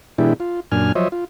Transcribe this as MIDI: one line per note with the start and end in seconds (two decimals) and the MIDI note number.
0.18 0.33 47
0.18 0.33 52
0.18 0.33 56
0.18 0.33 62
0.18 0.33 64
0.18 0.33 67
0.40 0.60 65
0.72 0.92 42
0.72 0.92 46
0.72 0.92 62
0.72 0.92 80
0.72 0.92 89
0.95 1.08 53
0.95 1.08 54
0.95 1.08 72
0.95 1.08 73
0.95 1.08 75
0.95 1.08 76
1.12 1.25 65